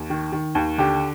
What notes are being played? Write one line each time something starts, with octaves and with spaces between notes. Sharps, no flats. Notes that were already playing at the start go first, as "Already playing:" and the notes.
Already playing: D#2
D#3
D#3
D#2
D3 G4